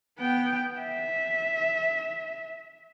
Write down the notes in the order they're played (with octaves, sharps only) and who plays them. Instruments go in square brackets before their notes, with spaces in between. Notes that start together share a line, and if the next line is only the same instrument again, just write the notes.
[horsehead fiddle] B3 G5
E5